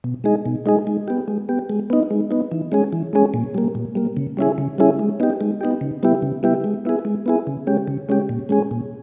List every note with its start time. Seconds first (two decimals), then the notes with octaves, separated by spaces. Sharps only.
0.04 B2
0.24 G#3 D#4 G#4
0.46 B2
0.66 G#3 D#4 G#4
0.87 G#3
1.08 B3 G4
1.28 G#3
1.49 B3 G4
1.70 G#3
1.90 B3 D#4
2.11 G#3
2.31 B3 D#4
2.51 E3
2.72 G#3 C#4 G#4
2.93 E3
3.13 G#3 C#4 G#4
3.34 A#2
3.54 G3 A#3
3.75 A#2
3.95 G3 A#3
4.17 C#3
4.37 G3 C#4 E4 G#4
4.58 C#3
4.78 G3 C#4 E4 G#4
4.99 G#3
5.20 B3 D#4 G4
5.41 G#3
5.61 B3 D#4 G4
5.81 C#3
6.03 G3 B3 E4 G4
6.22 C#3
6.43 G3 B3 E4 G4
6.64 G#3
6.85 B3 E4 G#4
7.05 G#3
7.26 B3 E4 G#4
7.47 C#3
7.67 G#3 C#4 G4
7.88 C#3
8.09 G#3 C#4 G4
8.29 A#2
8.49 G#3 C#4 G#4
8.71 A#2